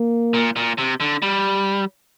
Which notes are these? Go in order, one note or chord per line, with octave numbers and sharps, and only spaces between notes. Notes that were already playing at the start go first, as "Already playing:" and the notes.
Already playing: A#3
A#2
A#2
C3
D3
G3